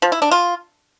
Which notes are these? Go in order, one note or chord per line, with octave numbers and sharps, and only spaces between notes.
F3
E4
D4
F4